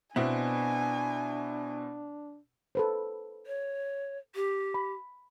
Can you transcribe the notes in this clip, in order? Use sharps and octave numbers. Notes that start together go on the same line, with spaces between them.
B2 B3 C4 D4 E4 G#5
A4 B4 C5
C#5
G4
B5